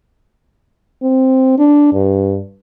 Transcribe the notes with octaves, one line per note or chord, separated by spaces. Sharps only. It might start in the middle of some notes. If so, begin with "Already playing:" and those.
C4
D4
G2